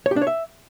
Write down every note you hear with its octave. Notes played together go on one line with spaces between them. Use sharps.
C#5
G4
D4
C#5
E5